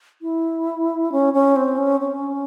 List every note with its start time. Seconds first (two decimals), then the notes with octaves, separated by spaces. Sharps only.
0.22 E4
1.12 C#4
1.34 C#4
1.56 C4
1.78 C#4
2.00 C#4